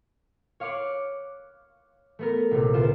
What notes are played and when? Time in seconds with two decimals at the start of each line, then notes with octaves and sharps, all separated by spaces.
0.60 C#5 F5 C#6 D6 F#6
2.19 A3 B3 A#4
2.51 A#1 C3
2.74 C#2 F4 E7